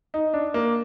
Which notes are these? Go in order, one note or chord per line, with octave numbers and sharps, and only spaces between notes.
D#4
D4
A#3